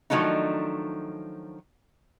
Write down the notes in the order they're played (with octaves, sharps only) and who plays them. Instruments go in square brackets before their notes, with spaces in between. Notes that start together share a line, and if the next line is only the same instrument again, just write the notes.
[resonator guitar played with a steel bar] D#3 F3 F#3 A3 D4 D#4